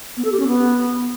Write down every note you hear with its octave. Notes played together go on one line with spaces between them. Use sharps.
B3
A4
G4
C#4
B3